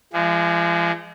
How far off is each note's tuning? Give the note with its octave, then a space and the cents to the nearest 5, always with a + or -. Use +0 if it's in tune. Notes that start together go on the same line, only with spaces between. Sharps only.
F3 -45 G#3 -15